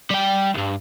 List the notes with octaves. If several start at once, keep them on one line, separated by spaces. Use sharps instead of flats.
G3 G5
C2 G2